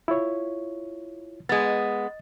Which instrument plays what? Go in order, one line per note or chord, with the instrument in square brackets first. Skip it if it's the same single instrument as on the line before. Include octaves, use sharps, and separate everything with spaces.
[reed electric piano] E4 F4 C#5
[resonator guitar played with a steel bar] G#3 B3 [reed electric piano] D#5 A6